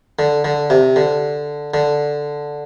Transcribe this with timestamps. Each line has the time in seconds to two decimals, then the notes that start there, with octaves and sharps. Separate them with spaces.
0.19 D3
0.45 D3
0.70 C3
0.96 D3
1.74 D3